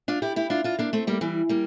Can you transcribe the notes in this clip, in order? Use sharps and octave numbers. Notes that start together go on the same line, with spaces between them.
D4 F4
E4 G4
E4 G4
D4 F4
D4 F4
A#3 D4
A3 C4
G3 A#3
E3 G3
G3 A#3